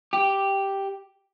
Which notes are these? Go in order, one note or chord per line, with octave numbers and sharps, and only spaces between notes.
G4